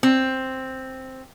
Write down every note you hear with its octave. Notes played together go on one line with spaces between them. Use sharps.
C4